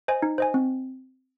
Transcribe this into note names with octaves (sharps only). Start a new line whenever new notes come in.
C5 D#5 G#5
D#4
C5 D#5 G#5
C4